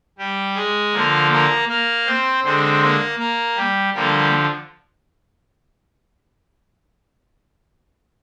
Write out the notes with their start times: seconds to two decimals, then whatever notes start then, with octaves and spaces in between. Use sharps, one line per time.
0.18 G3 G4
0.55 G#3 G#4
0.93 D3 F3 A#3 A#4
1.31 A#3 A#4
1.68 A#3 A#4
2.06 C4 C5
2.44 D3 G#3 C4 C5
2.81 A#3 A#4
3.18 A#3 A#4
3.56 G3 G4
3.94 D3 F3 G3 A#3 G4